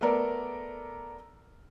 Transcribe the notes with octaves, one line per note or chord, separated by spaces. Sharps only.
A3 B3 A4 A#4 D5